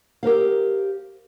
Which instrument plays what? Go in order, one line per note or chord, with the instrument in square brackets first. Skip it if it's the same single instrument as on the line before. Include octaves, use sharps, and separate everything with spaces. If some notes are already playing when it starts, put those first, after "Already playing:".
[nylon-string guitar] G4 A#4 C5 F5